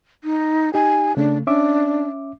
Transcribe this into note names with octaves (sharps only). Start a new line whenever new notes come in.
D#4
D#4 G4 G#5
C#3 A3 D4
C#4 D4 E5 D6